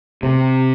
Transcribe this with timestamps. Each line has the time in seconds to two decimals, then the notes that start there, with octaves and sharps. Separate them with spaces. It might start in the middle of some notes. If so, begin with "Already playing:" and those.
0.23 C3